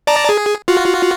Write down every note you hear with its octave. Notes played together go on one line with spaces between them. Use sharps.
D5 A5 A#5
G#4
F4 F#4